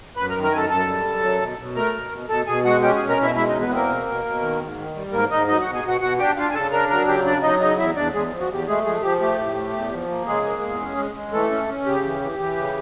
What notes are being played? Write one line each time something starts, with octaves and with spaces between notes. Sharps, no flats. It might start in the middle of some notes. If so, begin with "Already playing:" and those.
F#2 B4 B5
D#3 A#4 A#5
A#4 A#5
F#2 A4 G#5 A5
F#2 A4 A5
G3
F#2
F#3
B2
B2
A3 A#4 A#5
B2
B2
B2 A4 A5
B2 G#4 G#5
G#3 F#4 F#5
C#4 G4 G5
G#4 G#5
B2
A#4 A#5
B2 E4 E5
G#3 E4 E5
D#4 D#5
E2
B3 B4
A#3 C4 A#4
B2
B2
B2
D#3
G#2
D#3
G3
G#2 A#3 A#4
G#2 D#4 D#5
F#3 D#4 D#5
F#4 F#5
B2
G#4 G#5
B2 F#4 F#5
B2 F#4 F#5
D4 G4 G5
D4 F4 F5
G#5
C#3 A4 A5
D4 A#4 A#5
F#3 A#4 A#5
C#3 G4 G5
D4 D5
F#3 D#4 D#5
C#3 D#4 D#5
E2 E4 E5
E2 D4 D5
E2 G#3 G#4
F3
F#4
E2 G4
G#3 A3 G#4
F3 G#3 G#4
F3 G4
A3 G4
A2
A3
E2
F3
A#3
C#3 G#3 G#4
A#3
E2
C#4
G#3
G#3
E3 A3 A4
C#4
C#4
C#3 G4
E3
E3
E3
C#3